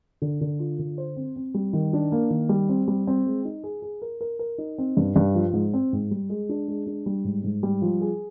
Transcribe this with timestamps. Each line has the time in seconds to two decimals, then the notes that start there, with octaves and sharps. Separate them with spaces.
0.22 D3
0.41 D3
0.59 F4
0.79 D3
0.98 C5
1.17 C4
1.36 C4
1.54 G3
1.73 D#3
1.93 D4
2.12 A#3
2.30 D#3
2.49 G3
2.69 C4
2.88 G3
3.07 C4
3.26 G#3
3.45 D#4
3.64 G#4
3.82 G#4
4.02 A#4
4.21 A#4
4.39 A#4
4.58 D#4
4.78 C4
4.97 G2
5.16 G2
5.35 F3
5.53 G#2
5.74 C4
5.93 G#2
6.11 G3
6.30 G#3
6.49 D4
6.68 G#3
6.87 D4
7.06 G3
7.24 G#2
7.44 G#2
7.63 G3
7.82 F3
8.01 G#4